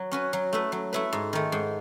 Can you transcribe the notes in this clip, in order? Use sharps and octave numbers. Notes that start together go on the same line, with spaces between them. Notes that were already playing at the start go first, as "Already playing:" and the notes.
Already playing: F#3
C#4 F#4 B4
F#3
A3 E4 B4
F#3
A3 E4 B4
G#2
D#3 A3
G#2